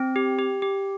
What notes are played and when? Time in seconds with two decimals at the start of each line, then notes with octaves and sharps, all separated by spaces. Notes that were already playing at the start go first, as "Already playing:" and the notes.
Already playing: C4
0.16 G4
0.39 G4
0.62 G4